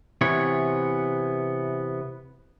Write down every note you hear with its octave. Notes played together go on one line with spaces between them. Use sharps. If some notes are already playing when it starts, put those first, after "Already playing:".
C3 E3 B3 C#5